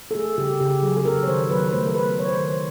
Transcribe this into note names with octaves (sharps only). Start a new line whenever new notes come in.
A4
A3 G#4
C#3 G4
C#3 G4
F#3 G#4
A4
C#3 A#4
C#5
D#3 C5
F#3 B4
B4
A3 C5
A#4
A3 B4
F#3 C#5
C5
D#3